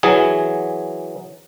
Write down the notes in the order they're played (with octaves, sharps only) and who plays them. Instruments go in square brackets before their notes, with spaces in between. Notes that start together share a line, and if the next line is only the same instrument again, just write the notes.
[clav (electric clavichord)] E3 F#3 G#4